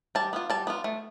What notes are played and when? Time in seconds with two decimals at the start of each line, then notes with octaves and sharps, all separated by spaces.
0.15 G3 A5
0.33 B3 F4
0.50 G3 A5
0.67 B3 F4
0.84 A3